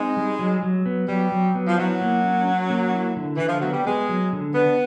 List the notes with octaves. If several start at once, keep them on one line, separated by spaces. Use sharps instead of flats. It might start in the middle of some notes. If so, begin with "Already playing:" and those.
Already playing: G#3 C4 D#4
G3
F#3
F#3
B3
F#3 G3
F#3
B3
F3
F#3 E4
A#3
C#4
C#4
A#3
E4
D3
D3 E3
F3
F#3 B3
G3
G#3 B3
F#3
D3
B3 D4